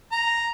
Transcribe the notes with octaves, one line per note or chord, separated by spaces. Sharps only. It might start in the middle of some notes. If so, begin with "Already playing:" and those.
A#5